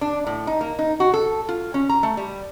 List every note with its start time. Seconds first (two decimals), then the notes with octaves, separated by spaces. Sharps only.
0.01 D4
0.27 A2
0.47 D#4
0.61 A#3
0.79 D#4
1.00 F#4
1.14 A4
1.49 F4
1.74 C#4
1.89 A#5
2.03 A3
2.17 G3